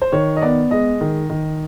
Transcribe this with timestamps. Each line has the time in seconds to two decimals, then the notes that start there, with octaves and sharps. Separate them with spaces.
0.02 C5
0.12 D#3 C#5
0.37 D#5
0.42 B3 D5
0.71 G#3 D#5
1.01 D#3
1.30 D#3